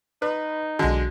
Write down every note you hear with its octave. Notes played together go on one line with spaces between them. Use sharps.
D#4 B4
B1 D3 G#3 F#4